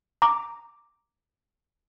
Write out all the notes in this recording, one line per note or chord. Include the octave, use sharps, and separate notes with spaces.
A#5 D6